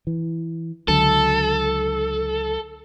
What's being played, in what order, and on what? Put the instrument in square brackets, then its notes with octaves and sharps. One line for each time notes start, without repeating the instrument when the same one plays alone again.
[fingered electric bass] E3
[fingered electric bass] C#2 D3 F#3 [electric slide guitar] A4